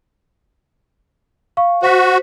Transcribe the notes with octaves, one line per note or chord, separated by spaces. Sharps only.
F5 C#6
F#4 C5 B6